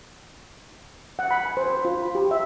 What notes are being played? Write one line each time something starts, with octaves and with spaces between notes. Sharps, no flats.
F#5
B5
G#5
C5
C5
F4
B5
G4
E5